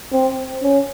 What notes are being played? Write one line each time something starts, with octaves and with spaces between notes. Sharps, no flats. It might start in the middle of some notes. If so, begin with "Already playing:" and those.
C4
C#4